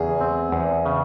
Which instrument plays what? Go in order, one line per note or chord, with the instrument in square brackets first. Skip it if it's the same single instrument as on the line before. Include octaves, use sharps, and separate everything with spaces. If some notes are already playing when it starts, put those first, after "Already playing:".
Already playing: [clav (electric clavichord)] E2 C#3 [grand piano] G#4
[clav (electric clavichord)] C4
E2
C#3